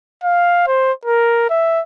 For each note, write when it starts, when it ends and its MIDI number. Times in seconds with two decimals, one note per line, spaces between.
0.24 0.63 77
0.67 0.92 72
1.05 1.47 70
1.50 1.81 76